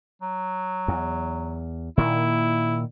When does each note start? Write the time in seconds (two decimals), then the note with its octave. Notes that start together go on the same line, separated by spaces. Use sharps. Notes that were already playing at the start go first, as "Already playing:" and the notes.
0.22 F#3
0.88 E2
1.97 A#2 D#3 A#3 E4